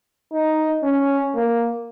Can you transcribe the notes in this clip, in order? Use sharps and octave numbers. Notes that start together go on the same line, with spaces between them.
D#4
C#4
A#3